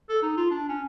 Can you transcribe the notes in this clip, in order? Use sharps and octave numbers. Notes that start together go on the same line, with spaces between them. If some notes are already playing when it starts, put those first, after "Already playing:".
A4
D#4
F4
D4
C#4